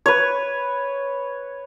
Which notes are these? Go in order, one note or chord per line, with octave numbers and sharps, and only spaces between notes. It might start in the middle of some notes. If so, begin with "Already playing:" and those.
B4 C#5